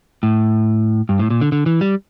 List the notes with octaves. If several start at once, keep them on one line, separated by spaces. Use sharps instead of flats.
A2
G2
A2
A#2
D3
D3
E3
G3